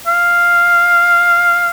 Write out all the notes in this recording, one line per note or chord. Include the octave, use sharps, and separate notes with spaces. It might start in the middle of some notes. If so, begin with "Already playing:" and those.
F5